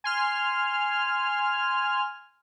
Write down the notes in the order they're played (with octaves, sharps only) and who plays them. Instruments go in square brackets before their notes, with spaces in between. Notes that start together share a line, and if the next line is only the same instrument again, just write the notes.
[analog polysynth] G#5 C6 F6